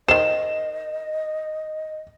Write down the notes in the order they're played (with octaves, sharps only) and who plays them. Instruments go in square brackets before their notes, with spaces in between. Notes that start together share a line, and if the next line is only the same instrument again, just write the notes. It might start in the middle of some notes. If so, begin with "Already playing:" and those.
[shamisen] D#3 C5 [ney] D#5 [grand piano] E7